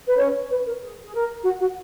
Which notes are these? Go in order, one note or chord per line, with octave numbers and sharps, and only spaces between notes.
B4
C#4 C#5
B4
A#4
G#4
G#4
A#4
F#4 F#5
F#4 F#5